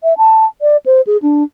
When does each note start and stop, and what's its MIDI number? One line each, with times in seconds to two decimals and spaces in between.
0.04 0.17 76
0.18 0.45 81
0.62 0.77 74
0.86 1.01 72
1.07 1.17 68
1.22 1.43 62